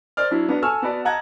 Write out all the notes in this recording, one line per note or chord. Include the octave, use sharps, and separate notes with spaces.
A#4 C5 D5 F6
F#3 D4 E4
B3 D4 F#4 B4
A4 G#5 C#6 E6 F6
B3 F#4 B4 D5 A5
D#5 F#5 A5 A#5 F#6 G#6